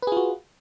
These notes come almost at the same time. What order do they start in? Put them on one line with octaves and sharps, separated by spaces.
B4 G#4 F4 F#4